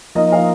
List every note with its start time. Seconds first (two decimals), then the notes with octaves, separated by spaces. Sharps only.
0.15 F3 A#3 D#4 D#5
0.32 F5